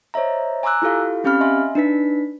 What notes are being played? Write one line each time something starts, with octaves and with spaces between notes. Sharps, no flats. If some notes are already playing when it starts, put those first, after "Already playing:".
C5 C#5 D#5 E5 A#5
G#5 A#5 C6 D6 E6 F#6
E4 F4 G4 A4 F5
C4 C#4 G4 F5 B5 F6
D#5 E5 G#5 C6
D4 D#4 B4 B6